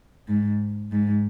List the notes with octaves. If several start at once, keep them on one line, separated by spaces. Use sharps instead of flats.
G#2
G#2